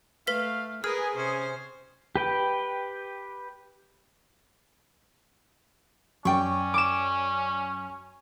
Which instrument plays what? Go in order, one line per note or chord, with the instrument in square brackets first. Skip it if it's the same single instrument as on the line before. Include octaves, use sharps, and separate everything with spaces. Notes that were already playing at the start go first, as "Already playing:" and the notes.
[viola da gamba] A3 [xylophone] B4 B6 [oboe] F5
[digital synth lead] G#4 [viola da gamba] A#4 B4 [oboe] D#6 [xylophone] F6
[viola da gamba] C3 C5 [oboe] C#4
[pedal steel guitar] G4 B4 G5
[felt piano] F#2 [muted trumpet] C#4 [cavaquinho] D5 G5 C#6
[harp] D6 E7